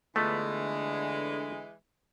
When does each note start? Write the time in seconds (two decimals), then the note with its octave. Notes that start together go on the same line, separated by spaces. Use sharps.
0.16 D3 E3 G#3 A3 B3 F4